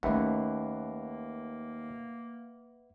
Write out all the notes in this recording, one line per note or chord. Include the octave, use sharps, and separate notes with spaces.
D#2 A3 A#3 C#4 B4 E5 F#5